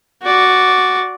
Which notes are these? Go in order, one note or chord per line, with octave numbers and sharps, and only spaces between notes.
F#4 D5